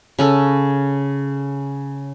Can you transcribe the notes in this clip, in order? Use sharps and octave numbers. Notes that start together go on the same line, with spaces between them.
C#3 C#4 A4